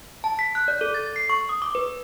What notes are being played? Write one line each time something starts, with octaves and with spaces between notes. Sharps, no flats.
A5
B6
F#6
D5
A4
A6
C7
C#6
D#6
D6
B4